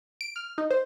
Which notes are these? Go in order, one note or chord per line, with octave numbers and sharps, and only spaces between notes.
D7
F6
D#4
C5